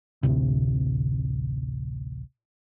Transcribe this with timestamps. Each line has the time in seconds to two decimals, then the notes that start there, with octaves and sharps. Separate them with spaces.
0.23 A1 D2 C3